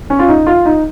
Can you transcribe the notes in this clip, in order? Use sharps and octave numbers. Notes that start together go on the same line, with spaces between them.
C#4
F4
D#4
F4
D#4